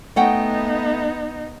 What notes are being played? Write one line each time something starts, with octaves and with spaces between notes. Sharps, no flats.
A3 B3 D#4 C#5 D#5 F#5 G5